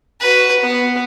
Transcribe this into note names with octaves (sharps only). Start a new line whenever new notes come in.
F#4 B4
B3